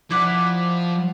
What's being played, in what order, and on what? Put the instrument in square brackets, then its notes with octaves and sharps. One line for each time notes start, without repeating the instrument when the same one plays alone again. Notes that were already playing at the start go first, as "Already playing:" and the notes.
[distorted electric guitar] F3 [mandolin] E4 D5 F#5